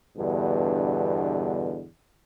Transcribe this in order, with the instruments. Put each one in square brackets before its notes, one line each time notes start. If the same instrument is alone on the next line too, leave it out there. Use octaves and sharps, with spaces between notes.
[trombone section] E2 G2 B2 D3